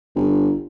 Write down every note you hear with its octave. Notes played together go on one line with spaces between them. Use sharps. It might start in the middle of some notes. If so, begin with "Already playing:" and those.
G1